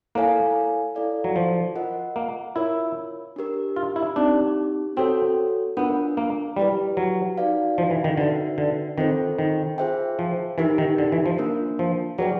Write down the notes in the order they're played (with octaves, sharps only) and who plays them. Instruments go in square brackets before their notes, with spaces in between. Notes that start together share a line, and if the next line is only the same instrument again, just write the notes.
[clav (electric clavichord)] A#3 [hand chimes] E4 A4 C#5 F5 G#5
[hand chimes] E4 A4 D5 F5
[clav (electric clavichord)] F#3
F3
[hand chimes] F4 A#4 D#5 F#5
[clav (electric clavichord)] A#3
[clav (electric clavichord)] E4 [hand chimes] F4 A#4 C#5
[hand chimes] D4 G4 A#4
[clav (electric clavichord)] F4
E4
[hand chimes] C4 D#4 G4 [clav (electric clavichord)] D4
[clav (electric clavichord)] C4 [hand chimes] F#4 A4 C#5
[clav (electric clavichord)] B3 [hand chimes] D4 F4 A#4
[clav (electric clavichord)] A#3
[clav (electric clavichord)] G3 [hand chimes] E4 G4 B4
[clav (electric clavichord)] F#3
[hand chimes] D#4 F#4 B4 D5 F5
[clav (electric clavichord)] F3
E3
D#3
[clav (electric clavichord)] D3 [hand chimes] D#4 F#4 B4 E5 G5
[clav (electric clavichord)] D3
[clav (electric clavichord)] D#3 [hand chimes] C4 F4 A4 C5
[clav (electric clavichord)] D#3
[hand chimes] F4 G#4 C5 E5 G5
[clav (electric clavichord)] F3
[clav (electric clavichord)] E3 [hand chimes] D#4 G4 A#4
[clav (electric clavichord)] D#3
D3
E3
F3
[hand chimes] A#3 D4 F4 A#4
[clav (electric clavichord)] F3
[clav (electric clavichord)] F#3 [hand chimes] G#4 B4 D5 G5